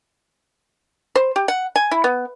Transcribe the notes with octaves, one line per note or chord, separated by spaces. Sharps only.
C5
G4
F#5
G#5
E4
B3